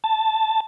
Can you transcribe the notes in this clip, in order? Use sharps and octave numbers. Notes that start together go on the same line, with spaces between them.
A5